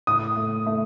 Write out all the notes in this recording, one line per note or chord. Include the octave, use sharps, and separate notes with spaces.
A2 D#6
A3
A3